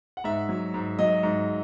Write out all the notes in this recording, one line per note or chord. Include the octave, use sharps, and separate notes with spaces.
F#5
G#2 E5
F#3
G#2
F#3 D#5
G#2